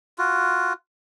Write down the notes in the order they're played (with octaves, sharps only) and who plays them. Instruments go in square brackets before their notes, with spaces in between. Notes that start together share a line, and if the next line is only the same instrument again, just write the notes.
[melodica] F4 F#4